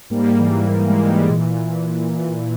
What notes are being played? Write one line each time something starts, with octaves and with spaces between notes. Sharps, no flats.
G#2 G3 A#3
E3
G#2 G3
A#3
G#3
E3
G3
A#2 G#3